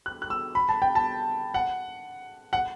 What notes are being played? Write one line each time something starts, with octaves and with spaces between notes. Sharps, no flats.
F#6
F#6
E6
B5
A5
G5
A5
F#5
F#5